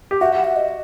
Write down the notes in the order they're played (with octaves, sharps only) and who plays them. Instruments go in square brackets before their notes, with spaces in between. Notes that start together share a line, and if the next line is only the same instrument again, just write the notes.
[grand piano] G4
[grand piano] F#4 [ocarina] E5
[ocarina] F#5
E5
D#5